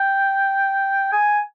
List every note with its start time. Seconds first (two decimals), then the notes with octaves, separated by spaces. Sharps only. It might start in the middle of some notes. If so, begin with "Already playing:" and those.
Already playing: G5
1.12 G#5